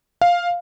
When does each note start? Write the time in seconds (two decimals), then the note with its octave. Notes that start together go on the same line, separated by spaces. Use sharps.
0.21 F5